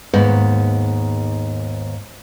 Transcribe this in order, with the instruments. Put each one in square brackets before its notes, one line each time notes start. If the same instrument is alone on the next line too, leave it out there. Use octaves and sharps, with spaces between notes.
[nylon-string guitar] D#2 G#2 B3